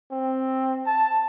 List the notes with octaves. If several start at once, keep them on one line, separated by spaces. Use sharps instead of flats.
C4
A5